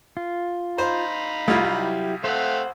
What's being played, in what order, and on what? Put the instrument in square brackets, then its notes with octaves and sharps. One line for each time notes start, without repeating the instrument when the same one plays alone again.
[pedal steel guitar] F4
[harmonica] D#4 F5 B5 [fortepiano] C5
[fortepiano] C2 G3 F4 [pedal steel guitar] A3 E4
[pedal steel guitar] F#3 E4 G4
[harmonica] A3 C4 F5 [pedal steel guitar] C5 F#5